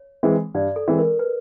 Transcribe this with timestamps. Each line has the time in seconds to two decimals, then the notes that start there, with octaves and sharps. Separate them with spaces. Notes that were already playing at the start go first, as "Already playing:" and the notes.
Already playing: C#5
0.23 E3 G#3 C4
0.54 G2 D5
0.76 A4
0.88 E3 G#3 C4
0.99 A#4
1.19 B4